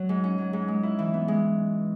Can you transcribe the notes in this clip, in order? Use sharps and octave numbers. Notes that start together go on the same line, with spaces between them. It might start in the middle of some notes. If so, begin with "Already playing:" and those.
Already playing: F#3
G#2
C#4
F#3
G#2
G#3
E4
E3
B3
G#3